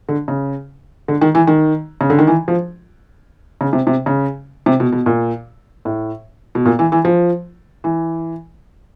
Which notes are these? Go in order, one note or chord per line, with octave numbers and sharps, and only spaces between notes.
D3
C#3
D3
D#3
E3
D#3
C#3
D3
D#3
E3
F3
C#3
C3
C3
C#3
C3
B2
B2
A#2
A2
B2
A#2
E3
E3
F3
E3